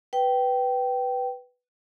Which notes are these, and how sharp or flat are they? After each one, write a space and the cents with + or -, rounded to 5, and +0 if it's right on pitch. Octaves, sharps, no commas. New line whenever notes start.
B4 +0 G5 -15